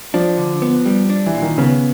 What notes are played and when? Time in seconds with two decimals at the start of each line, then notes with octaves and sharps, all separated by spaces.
0.14 F3 D4
0.38 D3
0.62 B3
0.86 G3
1.10 D4
1.26 E3
1.34 A#2
1.42 D#3
1.58 C#3 B3